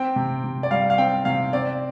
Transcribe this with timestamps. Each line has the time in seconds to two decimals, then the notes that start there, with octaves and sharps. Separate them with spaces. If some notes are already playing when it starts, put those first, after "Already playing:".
Already playing: C4 G5
0.16 C3
0.44 C3
0.63 D5
0.71 G3 F5
0.90 F5
0.98 C4 G5
1.25 C3 F5
1.53 C4 D5